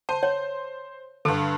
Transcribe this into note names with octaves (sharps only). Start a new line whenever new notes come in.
C5 A5
C#5
G2 D3 A4